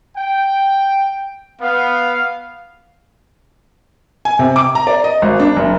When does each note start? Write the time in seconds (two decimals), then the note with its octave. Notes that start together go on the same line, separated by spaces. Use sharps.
0.17 G5
1.61 B3 F5
4.25 G#5
4.39 C3
4.56 D6
4.75 A#5
4.87 D5
5.04 D#5
5.22 G#1
5.40 D4
5.57 F#1